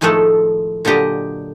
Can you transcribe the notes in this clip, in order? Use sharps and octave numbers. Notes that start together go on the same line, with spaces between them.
A2 D#3 F3 G#3 A3 A4
A#2 D3 F#3 G4 D#5